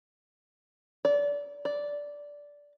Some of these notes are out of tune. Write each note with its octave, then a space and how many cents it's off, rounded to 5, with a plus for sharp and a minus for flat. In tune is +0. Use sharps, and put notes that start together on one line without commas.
D5 -30
D5 -10